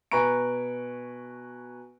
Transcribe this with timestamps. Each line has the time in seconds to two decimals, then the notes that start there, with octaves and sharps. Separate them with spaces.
0.11 B2 B4 G#5 A#5 C#6 D7